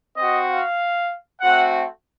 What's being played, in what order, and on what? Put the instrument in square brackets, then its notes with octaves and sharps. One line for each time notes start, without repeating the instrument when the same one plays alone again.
[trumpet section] C4 F#4 D#5
F5
A3 C4 F#4 F#5